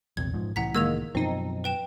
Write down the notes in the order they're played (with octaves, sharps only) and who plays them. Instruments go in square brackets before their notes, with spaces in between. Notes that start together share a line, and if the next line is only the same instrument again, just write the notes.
[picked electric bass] A#1 E2 C3 [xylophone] G#6
[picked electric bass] G#2 F3
[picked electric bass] C2 A2 E3 [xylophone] F#5 A#5 B6
[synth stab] D#3 G#3 A#3 [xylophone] E6 G#6 F7
[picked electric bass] F#2 B2 F3 [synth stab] C4 D#4
[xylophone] B4 G5 E7